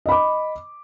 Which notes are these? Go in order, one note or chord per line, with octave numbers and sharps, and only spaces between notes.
D#5 B5 D6